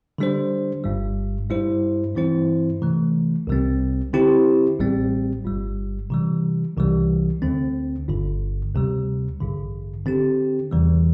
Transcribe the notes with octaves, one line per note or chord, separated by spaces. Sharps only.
D3 G3 D4 C5
G1 G2 G3
G2 G3 E4 C5
G2 E3 C4 E4 C5
C3 E3 A3
C2 C3 G3 C4
D3 C4 E4 G4 C5
A1 A2 G3 C4
G1 G2 G3
C3 E3 G3
C2 C3 E3 G3
D2 D3 C4
G1 G2 D3
D2 C3 G3
A1 G2 D3
D3 C4 G4
E2 C3 E3 G3